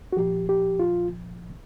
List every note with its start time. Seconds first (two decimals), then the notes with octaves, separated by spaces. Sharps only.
0.12 F#4
0.17 A#2 F3 G4
0.49 G4
0.79 F4